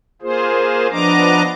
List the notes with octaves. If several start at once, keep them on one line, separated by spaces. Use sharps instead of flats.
A#3 F4 G#4 C5
F3 B3 D4 D#5 A#5 D6